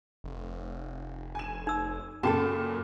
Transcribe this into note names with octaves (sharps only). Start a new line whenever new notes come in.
F1
G#5 E7
D#4 E6
F#2 A#2 C#3 F#4 A4 G5 A5